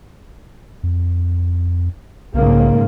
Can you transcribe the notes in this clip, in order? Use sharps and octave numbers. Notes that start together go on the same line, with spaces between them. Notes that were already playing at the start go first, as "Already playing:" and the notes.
F2
B1 G#2 C#3 A#3